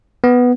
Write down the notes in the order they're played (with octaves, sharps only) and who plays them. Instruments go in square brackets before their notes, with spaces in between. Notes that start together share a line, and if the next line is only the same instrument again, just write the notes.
[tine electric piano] B3